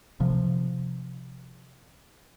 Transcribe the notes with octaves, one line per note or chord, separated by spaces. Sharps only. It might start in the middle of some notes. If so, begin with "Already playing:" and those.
C3 F3